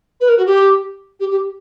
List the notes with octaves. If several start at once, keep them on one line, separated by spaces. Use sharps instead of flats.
B4
A#4
F#4
G4
G4
G4